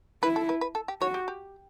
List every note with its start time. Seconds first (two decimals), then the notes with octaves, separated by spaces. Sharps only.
0.23 E4 B4
0.36 A4
0.49 B4
0.61 B4
0.75 A4
0.88 G4
1.01 F#4 C#5
1.14 G4
1.28 G4